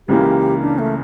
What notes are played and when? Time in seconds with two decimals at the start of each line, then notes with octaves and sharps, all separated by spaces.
0.08 C#2 C#3 E3 A#3 G4
0.61 D4
0.79 A3